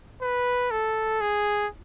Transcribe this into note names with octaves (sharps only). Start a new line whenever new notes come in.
B4
A4
G#4